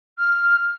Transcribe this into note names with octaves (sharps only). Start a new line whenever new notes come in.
F6